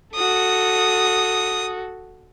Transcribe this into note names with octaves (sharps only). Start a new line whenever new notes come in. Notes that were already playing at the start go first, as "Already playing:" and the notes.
F#4 A4 D#6